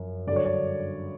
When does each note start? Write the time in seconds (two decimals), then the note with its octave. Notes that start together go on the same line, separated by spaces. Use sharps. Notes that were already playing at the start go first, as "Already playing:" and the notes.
Already playing: F#2 F3
0.27 G2 D3 F#3 D5
0.36 C#5
0.45 D5